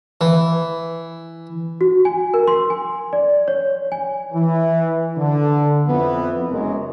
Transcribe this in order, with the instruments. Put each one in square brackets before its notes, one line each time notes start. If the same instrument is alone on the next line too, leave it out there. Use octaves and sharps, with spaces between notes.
[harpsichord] E3
[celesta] F#4
G#5
A#4
C6
G#5
D5
C#5
G#5
[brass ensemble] E3
D3
F2 E3 B3
F#1 F#2 G#3 A#4